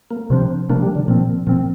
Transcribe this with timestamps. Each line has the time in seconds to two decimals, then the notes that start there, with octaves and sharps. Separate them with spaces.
0.11 A#3
0.30 C3 F3 C4 D4
0.69 C3 F3 A#3 D4
0.82 G3
0.95 D3
1.08 A#2 F3 C4
1.47 A#2 F3 C4